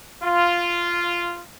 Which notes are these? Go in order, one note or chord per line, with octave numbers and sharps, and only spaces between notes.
F4